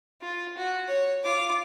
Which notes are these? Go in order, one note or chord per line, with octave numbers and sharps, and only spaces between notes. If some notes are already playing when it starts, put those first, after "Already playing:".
F4
F#4
C#5
F4 D6